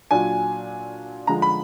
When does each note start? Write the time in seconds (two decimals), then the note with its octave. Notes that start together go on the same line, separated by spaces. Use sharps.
0.11 A#2 F#3 D4 G#5
1.27 D3 F3 G#3 A#5
1.42 B5